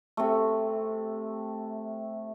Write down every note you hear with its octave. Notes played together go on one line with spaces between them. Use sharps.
C3 A3